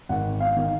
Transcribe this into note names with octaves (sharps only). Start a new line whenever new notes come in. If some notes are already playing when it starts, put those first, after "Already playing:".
G#1 F#5
F5
D#3